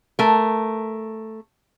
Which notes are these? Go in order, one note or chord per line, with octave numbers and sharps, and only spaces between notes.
A3 A#4